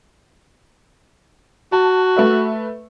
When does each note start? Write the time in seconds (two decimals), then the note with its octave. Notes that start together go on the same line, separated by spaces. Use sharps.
1.72 F#4 A5
2.16 A3 B4 E5